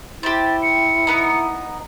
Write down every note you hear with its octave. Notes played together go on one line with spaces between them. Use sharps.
E4 G4 C5 A6
C#7
B3 D#4